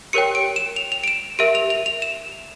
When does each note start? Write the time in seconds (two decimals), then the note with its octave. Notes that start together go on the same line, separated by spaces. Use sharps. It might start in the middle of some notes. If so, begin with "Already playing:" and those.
0.13 G4 A#4 C#5 G5 C#7
0.35 D7
0.56 E7
0.76 F7
0.92 F7
1.04 D7
1.08 E7
1.39 G4 A#4 E5 D7
1.55 F7
1.70 F7
1.86 F7
2.02 E7